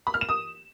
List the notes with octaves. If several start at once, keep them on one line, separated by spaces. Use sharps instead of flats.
B5
F6
E7
D#6